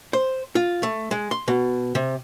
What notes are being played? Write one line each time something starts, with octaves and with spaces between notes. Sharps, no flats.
C5
F4
A3
G#3
C6
B2
C3